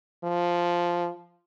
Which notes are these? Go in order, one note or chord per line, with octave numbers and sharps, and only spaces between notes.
F3